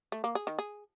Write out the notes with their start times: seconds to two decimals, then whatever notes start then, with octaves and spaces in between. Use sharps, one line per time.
0.12 A3
0.24 A#3
0.35 G#4
0.47 D#3
0.59 G#4